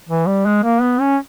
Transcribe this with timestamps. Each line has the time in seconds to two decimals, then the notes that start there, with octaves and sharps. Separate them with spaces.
0.09 E3
0.27 G3
0.46 G#3
0.64 A#3
0.82 B3
1.00 C#4